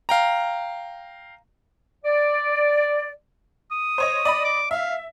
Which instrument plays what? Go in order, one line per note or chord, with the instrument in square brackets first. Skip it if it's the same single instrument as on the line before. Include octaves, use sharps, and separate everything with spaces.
[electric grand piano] F5 G5 A#5
[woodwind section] D5
[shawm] D#6
[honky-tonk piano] C5 C#5 D#5
D5 D#5 B5
[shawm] D6
[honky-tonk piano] E5 [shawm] F5